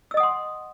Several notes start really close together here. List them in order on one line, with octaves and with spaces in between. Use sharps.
E6 D#5 D#6 F#5 C6